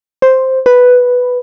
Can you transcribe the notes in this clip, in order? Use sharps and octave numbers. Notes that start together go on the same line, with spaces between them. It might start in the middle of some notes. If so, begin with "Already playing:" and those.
C5
B4